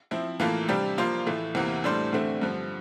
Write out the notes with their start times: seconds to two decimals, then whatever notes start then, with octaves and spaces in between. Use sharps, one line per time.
0.11 F3 C4 E4
0.40 A2 E3 A#3 F4 A4
0.68 C3 G3 D4 G4
0.98 F3 A#3 F4 C5
1.26 A2 E3 A3
1.55 E2 C3 E3 A#3
1.84 A2 G3 D4 A4 C5
2.13 E2 D3 A3 C4
2.42 G2 D3 F3